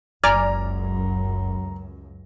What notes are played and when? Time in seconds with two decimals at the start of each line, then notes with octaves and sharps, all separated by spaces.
0.24 F#1 C#2 F#2 D5 G#5 A#5 F6